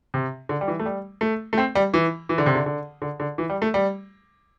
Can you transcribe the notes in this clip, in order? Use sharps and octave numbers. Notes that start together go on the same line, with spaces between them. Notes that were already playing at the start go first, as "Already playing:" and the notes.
C3
D3
G3
E3
A3
G3
A3
A3
C4
G3
E3
E3
D3
C3
D3
D3
D3
D3
E3
G3
A3
G3